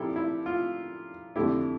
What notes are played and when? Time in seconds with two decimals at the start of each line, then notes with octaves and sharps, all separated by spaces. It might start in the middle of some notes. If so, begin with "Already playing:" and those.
Already playing: A#2 F3 C4 E4 G4 A4
0.16 E4
0.46 F4
1.36 F2 D3 A3 E4 G4